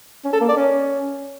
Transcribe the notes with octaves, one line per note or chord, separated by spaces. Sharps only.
C#4
A4
A#3
D5
C#4